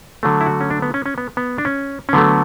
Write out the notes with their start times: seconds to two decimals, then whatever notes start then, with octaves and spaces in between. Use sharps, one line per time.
0.23 D3 F#3 A3
0.41 E4
0.46 F#4
0.61 C#4
0.70 D4
0.82 B3
0.94 C#4
1.06 C#4
1.18 B3
1.37 B3
1.58 D4
1.65 C#4
2.09 C#4
2.13 D3 F#3 A3 B3